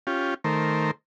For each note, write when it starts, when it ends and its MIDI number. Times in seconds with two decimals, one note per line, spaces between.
0.07 0.34 61
0.07 0.34 65
0.07 0.34 67
0.44 0.91 51
0.44 0.91 57
0.44 0.91 70
0.44 0.91 72